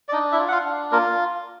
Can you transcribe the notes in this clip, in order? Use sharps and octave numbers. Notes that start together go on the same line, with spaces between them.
D5
D4 D#4 D#5
E4 E5
F4
F#5
F4 F5
D4
A#3 F4 A#4